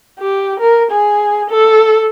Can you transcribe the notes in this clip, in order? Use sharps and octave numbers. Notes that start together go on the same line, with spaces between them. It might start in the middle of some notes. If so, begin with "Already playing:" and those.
G4
A#4
G#4
A4